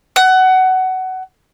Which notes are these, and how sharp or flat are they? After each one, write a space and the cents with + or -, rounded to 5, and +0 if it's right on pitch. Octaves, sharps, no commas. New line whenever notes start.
F#5 +20